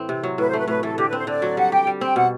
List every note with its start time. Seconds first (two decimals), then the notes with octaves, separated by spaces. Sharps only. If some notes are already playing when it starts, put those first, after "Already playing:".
Already playing: A2 E3 C4
0.09 C3
0.23 F#3
0.38 A2 B4
0.48 C5
0.53 A3 B4
0.68 A2 B4
0.83 E3 A4
0.98 D3 G4
1.07 B4
1.13 C4 C5
1.27 D3 D5
1.42 F#3
1.57 G3 F#5
1.72 G4 G5
1.87 G3
2.01 C4 G5
2.16 B2 F#5